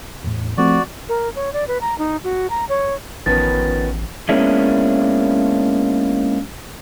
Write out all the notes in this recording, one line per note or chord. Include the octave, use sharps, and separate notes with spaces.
E2 A2
F3 A3 C4 F#4 D5
A#4
C#5
D5
B4
A#5
D#4
F#4
A#5
C#5
A1 D#3 F3 B3 C#4 B4 A6
G#3 A#3 B3 C#4 D4 E4